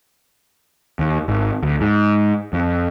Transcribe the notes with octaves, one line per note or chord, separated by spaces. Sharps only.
D#2
G#1
D2
G#2
F2